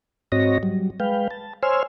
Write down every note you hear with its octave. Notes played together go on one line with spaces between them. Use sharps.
G#2 C4 F#4 C#5 D#5 A#6
F#3 G3
G#3 B4 F5 G5
A5
C5 C#5 G#5 C6 E6 F6